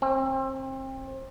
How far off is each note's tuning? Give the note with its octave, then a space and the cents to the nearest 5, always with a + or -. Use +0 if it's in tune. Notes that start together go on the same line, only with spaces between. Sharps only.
C4 +30